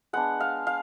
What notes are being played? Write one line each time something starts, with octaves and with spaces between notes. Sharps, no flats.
G#3 B3 D4 F#5
F5
F5